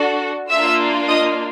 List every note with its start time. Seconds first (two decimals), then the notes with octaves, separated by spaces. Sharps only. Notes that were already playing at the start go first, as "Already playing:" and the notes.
Already playing: D4 F#4 A4
0.50 A#3 D4 F4 E5 E6
1.08 D#5 D#6